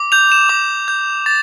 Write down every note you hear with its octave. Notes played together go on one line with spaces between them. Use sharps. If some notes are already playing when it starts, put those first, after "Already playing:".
Already playing: D6
G6 F7
E7
D6
G6
D6 A6